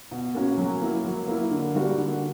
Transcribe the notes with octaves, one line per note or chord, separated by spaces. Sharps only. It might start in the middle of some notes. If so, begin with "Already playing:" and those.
B2
A#3 C#4 F#4
F#3
A#3 E4
F#3
A#3 E4
D3
G3 A#3 D4 F#4
D3